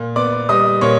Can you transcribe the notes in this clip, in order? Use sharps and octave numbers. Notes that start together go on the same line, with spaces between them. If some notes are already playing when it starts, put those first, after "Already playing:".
Already playing: A#2
B3 D5 D6
G3 D#5 D#6
A#2 C#5 C#6